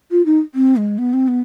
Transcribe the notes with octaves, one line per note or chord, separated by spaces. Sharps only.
F4
D#4
C4
G#3
B3
C4
B3